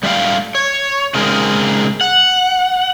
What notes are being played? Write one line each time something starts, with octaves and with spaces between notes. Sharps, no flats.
G3 A3 F4 D#5 F5 G5
C#5
C#3 G#3 C4 D#4 G#4 A#4
F#5